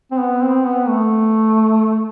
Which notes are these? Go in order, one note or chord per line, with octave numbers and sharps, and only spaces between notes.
C4
B3
C4
B3
A3